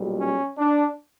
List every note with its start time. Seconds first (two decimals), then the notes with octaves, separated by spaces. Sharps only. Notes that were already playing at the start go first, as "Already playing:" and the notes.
Already playing: B1 A#2 G3
0.18 C#4
0.58 D4